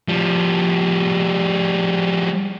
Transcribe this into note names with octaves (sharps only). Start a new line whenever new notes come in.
F3 G3